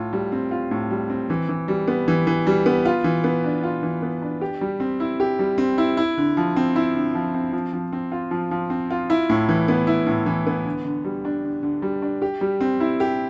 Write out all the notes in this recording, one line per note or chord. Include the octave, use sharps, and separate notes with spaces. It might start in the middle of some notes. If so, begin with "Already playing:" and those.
Already playing: A2 F4
G3
C4
F4
A2
G3
C4
E3
E3
G3
B3
E3
E3
G3
B3
F4
E3
B3
D4
F4
E3
B3
D4
G4
G3
C4
E4
G4
G3
C4
E4
E4
D3
F3
C4
E4
D3
F3
C4
F3
F3
C4
F4
F3
F3
C4
F4
E4
A2
E3
B3
E4
A2
E3
B3
D3
D3
G3
D4
D3
D3
G3
D4
G4
G3
C4
E4
G4